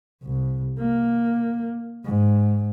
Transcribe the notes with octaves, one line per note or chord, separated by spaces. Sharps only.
C2
A#3
G#2